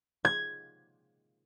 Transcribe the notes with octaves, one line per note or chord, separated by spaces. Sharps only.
G#6